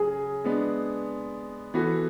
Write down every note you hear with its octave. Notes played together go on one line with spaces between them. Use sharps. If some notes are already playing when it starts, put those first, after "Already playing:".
Already playing: C#3 F#3 G#4
G#3 B3 D4
E3 B3 F#4 A4